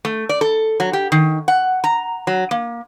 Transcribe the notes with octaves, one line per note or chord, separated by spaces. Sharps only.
A3
D5
A4
F#3
G4
D#3
F#5
A#5
F#3
A#3